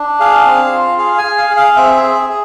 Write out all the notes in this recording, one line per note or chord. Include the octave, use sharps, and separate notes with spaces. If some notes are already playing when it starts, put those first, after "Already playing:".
Already playing: D4
G#4 F5
C4
F4
G#4 F5
G#5
G#4
F5
G#4
F5
C4 E5
G#4
G#4